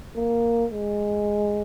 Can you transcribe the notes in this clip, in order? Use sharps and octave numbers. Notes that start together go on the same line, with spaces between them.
A#3
G#3